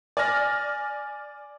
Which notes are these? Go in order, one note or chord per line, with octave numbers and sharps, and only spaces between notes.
D5 G#5 F6 A#6